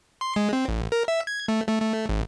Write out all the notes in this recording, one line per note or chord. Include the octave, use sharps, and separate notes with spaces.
C6
G#3
C4
A1
A#4
E5
G#6
A3
A3
A3
G#1